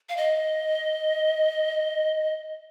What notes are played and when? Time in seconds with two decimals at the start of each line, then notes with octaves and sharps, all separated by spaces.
0.09 F5
0.17 D#5